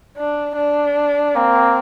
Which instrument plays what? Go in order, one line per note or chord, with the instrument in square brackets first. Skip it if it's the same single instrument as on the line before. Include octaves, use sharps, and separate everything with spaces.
[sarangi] D4
D4
[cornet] A#3 [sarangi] C4